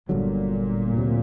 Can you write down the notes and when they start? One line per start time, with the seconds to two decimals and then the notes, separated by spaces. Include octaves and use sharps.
0.09 G1 G2 A#2 D3 F#3
0.96 D2 C3 F#3